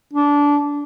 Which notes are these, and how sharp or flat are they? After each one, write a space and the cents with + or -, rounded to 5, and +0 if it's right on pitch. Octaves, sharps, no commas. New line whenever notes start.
D4 -20